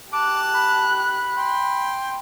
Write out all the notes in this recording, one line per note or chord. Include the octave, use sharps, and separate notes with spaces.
G4 A5 D6 F#6
B5
G5 C6